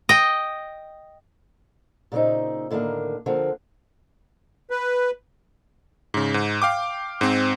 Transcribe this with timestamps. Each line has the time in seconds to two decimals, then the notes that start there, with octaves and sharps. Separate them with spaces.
0.09 D#5 G5
2.12 A#2 C#3 B3 C4 D#4
2.71 A2 D3 D#3 A3 A#3
3.26 D3 F3 A#3 C4
4.70 B4
6.14 G#2 C#3
6.34 G#2
6.62 F5 G5 D6
7.21 G#2 C4